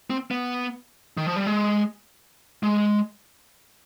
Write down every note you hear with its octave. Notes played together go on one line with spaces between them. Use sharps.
C4
B3
D#3
F3
G3
G#3
G#3